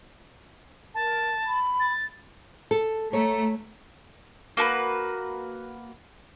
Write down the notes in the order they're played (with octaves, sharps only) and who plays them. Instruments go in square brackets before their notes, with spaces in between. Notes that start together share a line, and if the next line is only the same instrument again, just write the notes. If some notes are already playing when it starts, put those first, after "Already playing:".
[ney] A#4 [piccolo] A5
[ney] B5
[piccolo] A6
[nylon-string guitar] A4
[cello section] A3 [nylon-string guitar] C#5 [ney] A#5
[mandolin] A#3 F#4 A#4 B4